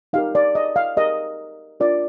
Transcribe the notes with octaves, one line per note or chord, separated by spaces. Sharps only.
D#4 G4 A#4 F5
D5
D#5
F5
D#4 G4 A#4 D#5
D4 F4 A#4 D5